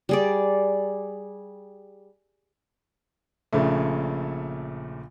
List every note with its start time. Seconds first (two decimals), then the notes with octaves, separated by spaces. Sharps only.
0.09 G3 G#4 D5
3.52 A#1 A#2 C#3 A3